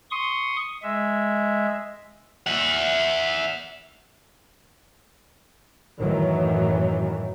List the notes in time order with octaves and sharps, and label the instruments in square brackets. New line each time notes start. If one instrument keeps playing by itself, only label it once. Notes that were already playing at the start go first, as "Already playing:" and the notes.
[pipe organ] C6 C#6 D#6
G#3 E5
[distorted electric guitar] E5 F#5
[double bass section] F#2 A2 D#3 E3 F#3